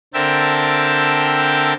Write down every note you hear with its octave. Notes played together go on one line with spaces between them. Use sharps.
D3 C4 A#4 E5 G5 A5